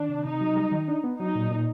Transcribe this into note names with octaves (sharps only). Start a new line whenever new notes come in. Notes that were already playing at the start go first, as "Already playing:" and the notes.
Already playing: D#3 D4
C3
C3 D#4
F#3
G3
D#3
D4
B3
F#3 D#4
A#2
A#2